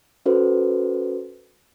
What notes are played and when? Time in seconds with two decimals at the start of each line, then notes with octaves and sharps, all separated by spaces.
0.26 C#4 F#4 A4 B4 C5